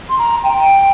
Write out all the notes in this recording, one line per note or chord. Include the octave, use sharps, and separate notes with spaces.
C6
A#5
G5